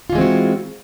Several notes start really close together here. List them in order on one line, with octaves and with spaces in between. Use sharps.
F4 E3 G#3 C4 F#4